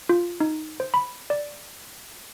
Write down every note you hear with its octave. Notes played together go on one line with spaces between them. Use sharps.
F4
D#4
C5
B5
D5